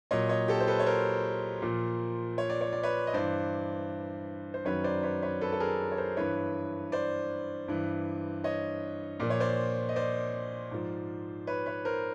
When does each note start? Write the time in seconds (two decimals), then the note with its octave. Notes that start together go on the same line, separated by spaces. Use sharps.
0.11 A#2 F#3 C#5 D#5
0.29 C#5 D#5
0.48 G4 A4
0.60 C5
0.67 A4 B4
0.79 C#5
0.86 A#4 C5
1.62 A#2 F3
2.38 C#5
2.50 D5
2.61 C#5
2.73 D5
2.83 B4 C#5
3.07 D#5
3.13 G2 E3 C5 D5
4.54 C5
4.65 F#2 D#3 F#3 B4 C#5
4.84 C5 D5
5.03 B4 C#5
5.22 B4 C#5
5.41 A4 B4
5.52 A4
5.60 G#4 A#4
5.92 C#5
5.98 A#4 C5
6.17 G2 E3 B4 C#5
6.92 C5 D5
7.68 G2 E3
8.44 C#5 D#5
9.20 A#2 F3 D5
9.30 C#5
9.40 C5 D5
9.89 D#5
9.96 C5 D5
10.71 G#2 F3
11.47 B4 C#5
11.66 B4 C#5
11.85 A#4 C5